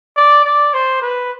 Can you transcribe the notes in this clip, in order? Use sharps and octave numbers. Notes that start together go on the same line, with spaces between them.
D5
D5
C5
B4